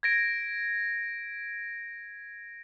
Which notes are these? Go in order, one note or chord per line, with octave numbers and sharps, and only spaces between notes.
G#6 A#6 D7